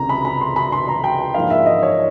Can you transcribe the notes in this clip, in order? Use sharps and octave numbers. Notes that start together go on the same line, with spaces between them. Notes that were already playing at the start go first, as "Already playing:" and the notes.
Already playing: C#2 C3 G#3 A#5
B5
B5
C6
B5
C6
A#5
G5
G#2 F3 A#3 D4 F5
E5
D#5
C#5